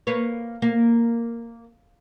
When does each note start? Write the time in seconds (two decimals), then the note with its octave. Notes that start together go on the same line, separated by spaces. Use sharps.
0.07 A#3 B4 C#5
0.62 A#3